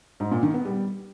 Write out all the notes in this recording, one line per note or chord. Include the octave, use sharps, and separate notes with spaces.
G#2
A#2
D#3
B3
G3